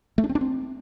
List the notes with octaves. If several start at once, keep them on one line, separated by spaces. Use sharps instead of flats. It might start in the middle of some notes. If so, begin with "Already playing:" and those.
A3
D4
C4
D4
C4